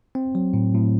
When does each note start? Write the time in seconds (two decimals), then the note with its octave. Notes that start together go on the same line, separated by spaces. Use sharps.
0.15 C4
0.35 F#3
0.54 A2
0.74 A2